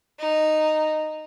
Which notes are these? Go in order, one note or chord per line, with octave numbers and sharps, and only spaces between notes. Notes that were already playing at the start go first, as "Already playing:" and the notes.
D#4